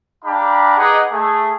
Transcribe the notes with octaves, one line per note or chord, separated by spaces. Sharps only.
D4 G4 F5 A#5 B5 D6
D#4 G#4 B4 D#5 F#5 D6
A3 G#4